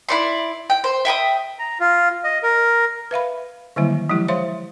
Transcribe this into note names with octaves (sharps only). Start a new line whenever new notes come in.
E4 D5 C6
G5
C5
E5 G5 B5 D#6
A#5
F4
D#5
A#4
B4 E5 F5 B5
D3 D#3 F#3 G3 A#3 E4
F3 F#3 G#3 E4 G4
C5 C#5 E5 F5 C6